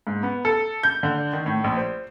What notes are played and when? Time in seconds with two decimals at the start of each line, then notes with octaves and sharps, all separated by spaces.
0.07 G#2
0.23 B3
0.45 A4
0.83 G6
1.03 D3
1.33 D#3
1.46 A2
1.64 A#1
1.77 C5